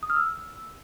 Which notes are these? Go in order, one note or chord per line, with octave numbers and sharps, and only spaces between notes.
D#6
F6
E6